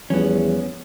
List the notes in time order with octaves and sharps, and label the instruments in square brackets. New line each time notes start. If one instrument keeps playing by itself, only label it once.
[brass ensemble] E2 [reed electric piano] F3 G3 [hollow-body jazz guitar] B3 C#4